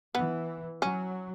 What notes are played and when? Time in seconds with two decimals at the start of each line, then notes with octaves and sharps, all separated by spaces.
0.15 E3 B3
0.82 F#3 C#4